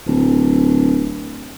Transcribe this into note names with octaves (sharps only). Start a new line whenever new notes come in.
D1